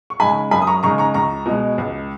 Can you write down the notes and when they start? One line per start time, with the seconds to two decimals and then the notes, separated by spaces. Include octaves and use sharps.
0.10 C#6
0.20 C#3 G#3 D#4 G#5 B5
0.51 F#2 G#5 B5
0.62 D#6
0.67 A#5 C#6
0.83 C#3 G#3 D#4 A#5 C#6
0.98 A#5 C#6
1.14 C#2 A#5 C#6
1.46 B2 G#3
1.78 C#2